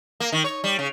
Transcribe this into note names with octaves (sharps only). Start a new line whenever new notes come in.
A#3
D#3
C#5
G3
C#3